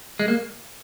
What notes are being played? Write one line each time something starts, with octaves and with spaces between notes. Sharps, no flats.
G#3
A#3